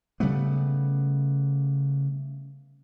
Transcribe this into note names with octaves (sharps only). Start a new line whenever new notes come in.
C#3 G3 A3 B3